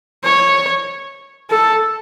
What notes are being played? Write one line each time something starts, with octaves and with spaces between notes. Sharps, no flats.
C#5
A4